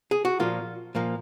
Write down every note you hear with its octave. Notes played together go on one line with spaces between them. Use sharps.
G#4
F#4
A#2 F3 A#3 F4
A#2 F3 A#3